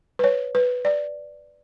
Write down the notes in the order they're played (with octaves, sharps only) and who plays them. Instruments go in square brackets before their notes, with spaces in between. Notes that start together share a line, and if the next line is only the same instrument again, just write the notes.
[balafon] B4
C#5
B4
D5